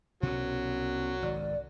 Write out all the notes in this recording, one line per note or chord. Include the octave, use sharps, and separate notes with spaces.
C2 B2 F#3 C#4
G#1 D5